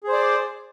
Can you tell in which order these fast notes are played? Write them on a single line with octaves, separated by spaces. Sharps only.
G#4 C5 D5